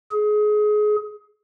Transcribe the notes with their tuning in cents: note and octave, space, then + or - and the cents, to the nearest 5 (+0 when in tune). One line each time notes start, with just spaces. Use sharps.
G#4 +25